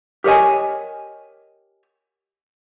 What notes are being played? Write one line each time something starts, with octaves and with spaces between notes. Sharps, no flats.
G4 A#4 C#5 D#5 G#5